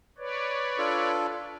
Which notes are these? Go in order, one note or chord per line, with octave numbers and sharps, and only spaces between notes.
B4 C#5 D5
D4 F4 A4